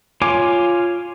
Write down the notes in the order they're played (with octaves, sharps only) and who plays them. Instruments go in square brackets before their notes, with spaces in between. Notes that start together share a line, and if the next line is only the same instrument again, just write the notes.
[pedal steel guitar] F4 C#5 G#5 D6